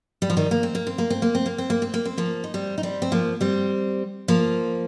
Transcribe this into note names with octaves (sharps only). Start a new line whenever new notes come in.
G3
F3
D#3 G3
A#3
C4
A#3
C4
A#3
C4
A#3
C4
A#3
C4
A#3
C4
A#3
C4
F3 A#3
D#4
G3 C4
D#4
G3 C4
C4
F3 A#3
G3 C4
F3 A#3